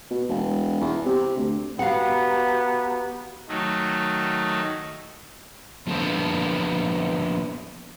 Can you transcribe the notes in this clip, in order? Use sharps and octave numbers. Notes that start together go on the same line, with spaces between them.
B2
E1
E2
C3
D2
B3 F#4 G4 F5 F#5 A#5
D#3 F#3 A3 D#4
F3 A#3 B3 D4 A4 C5